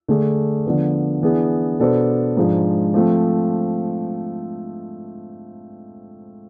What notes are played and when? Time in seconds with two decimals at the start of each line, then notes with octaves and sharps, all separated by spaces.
0.08 D3 A3 D4 G#4
0.66 D3 F3 B3
1.23 E3 B3 D4 G#4
1.79 B2 B3 D4 A4 C5
2.37 G#2 F3 G#3 D4
2.94 F3 A3 C4